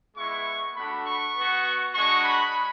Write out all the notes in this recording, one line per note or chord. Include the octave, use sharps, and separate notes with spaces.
G#3 B3 E4 C#6
A3 D4 F#4 B5
C#6
B3 F#4
G#3 D4 F#4 C#6
B5